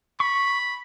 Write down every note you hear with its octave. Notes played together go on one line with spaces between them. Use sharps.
B5 C#6